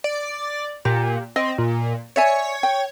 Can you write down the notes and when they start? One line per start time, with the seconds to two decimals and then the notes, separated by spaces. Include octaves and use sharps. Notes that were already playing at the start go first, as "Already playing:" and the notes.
0.04 D5
0.85 A#2 G4
1.36 C4 D#5
1.58 A#2
2.16 C#5 D5 E5 G#5
2.63 G5